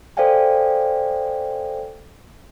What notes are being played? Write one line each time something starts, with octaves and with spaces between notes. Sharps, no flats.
A4 C5 D5 F5 G5 G#5